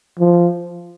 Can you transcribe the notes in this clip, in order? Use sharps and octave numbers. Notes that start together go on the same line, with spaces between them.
F3